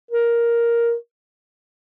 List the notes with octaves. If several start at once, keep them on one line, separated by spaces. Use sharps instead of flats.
A#4